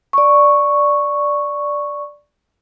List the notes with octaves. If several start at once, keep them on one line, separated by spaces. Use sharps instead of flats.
D5 C#6